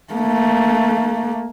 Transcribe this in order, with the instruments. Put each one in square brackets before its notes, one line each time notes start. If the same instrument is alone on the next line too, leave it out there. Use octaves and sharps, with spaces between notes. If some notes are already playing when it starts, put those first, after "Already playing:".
[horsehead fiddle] A3 A#3